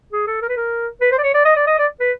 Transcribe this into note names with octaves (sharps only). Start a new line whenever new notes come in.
G#4
A4
A#4
B4
A#4
B4
C5
D5
C#5
D5
D#5
D5
D#5
D5
B4